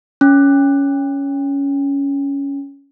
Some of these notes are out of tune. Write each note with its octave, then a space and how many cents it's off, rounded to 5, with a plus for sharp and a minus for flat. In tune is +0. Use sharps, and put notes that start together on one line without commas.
C#4 +10